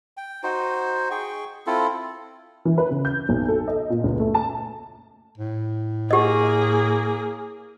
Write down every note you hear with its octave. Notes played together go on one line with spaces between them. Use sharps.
G5
D#4 F#4 C5
G#4 G5 C#6
C4 E4 F4 A4
E3
B4
C#3
G6
B1
A4
D#5
A#2
C#2
A3
A5
A2
A#3 G4 G#4 D#5